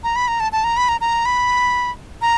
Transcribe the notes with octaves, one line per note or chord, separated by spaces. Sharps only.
A#5
B5
A#5
A5
A5
A#5
B5
A#5
A#5
B5
A#5